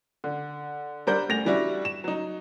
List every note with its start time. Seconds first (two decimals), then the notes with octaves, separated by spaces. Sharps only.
0.24 D3
1.07 G3 D4 A#4 C5 F#5 G6
1.29 D2 A#6 F7
1.46 E3 G3 D4 E4 F#4
1.85 E7
2.04 F#3 D#4